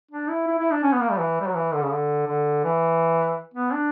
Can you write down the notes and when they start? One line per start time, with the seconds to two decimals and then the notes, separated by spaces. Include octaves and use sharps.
0.11 D4
0.29 E4
0.47 E4
0.59 E4
0.71 D4
0.83 C#4
0.93 B3
1.01 A#3
1.11 G3
1.19 E3
1.41 G3
1.48 F#3
1.56 E3
1.74 D3
1.83 C#3
1.92 D3
2.27 D3
2.64 E3
3.54 B3
3.73 D4